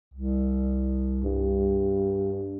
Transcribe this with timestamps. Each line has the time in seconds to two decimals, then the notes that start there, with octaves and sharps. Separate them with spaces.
0.14 C2
1.24 G2